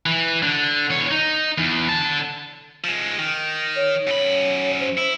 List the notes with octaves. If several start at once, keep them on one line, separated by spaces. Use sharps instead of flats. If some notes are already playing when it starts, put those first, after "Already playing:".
E3
D3
E2 C#5
D#4
E2
D3 A5
F3 G#3
D#3
C#5
F#2 B5
C5
E4